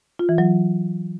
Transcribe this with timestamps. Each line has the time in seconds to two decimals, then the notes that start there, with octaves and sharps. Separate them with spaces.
0.19 F4
0.29 E3
0.38 F#3